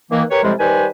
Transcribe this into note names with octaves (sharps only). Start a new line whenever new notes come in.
D#3 E3 A#3
G4 A#4 B4 C#5
A2 C3 F3 G3 G#3
D#3 G3 B4 C5 G#5